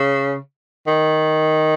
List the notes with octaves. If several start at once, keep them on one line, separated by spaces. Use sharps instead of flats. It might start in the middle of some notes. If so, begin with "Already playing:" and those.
Already playing: C#3
D#3